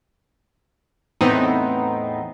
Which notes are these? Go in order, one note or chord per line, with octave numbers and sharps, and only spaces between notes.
E2 A2 B3 C4 D#4